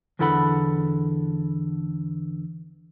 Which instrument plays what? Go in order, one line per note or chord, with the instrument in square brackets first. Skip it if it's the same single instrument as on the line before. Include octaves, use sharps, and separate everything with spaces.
[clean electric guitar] E2 D3 E4 A4 F#5 B5